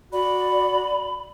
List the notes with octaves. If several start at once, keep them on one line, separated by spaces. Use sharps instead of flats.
F#4 D5 B5